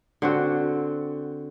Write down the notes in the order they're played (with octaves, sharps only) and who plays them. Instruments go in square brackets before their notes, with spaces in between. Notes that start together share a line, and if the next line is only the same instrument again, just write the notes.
[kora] D3 C4 F#4